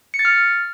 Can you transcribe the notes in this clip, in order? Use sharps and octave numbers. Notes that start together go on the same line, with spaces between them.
C#7
A6
F6